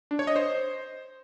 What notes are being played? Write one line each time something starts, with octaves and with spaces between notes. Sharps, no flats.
D4
C#5
D#5
C5